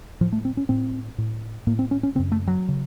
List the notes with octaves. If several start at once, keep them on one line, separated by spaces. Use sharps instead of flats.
A2 F3
A3
C4
C#4
A2 C4
A2
A2 A#3
C4
C#4
C#4
F#2 C#3 C4
A3
F#3
C#3